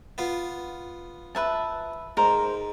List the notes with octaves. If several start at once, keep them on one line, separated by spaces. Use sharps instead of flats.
B3 F4
B4 E5 A5
G#2 A#4 C5